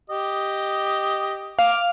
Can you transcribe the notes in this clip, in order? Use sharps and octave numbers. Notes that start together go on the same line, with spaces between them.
G4 D#5
F5 D6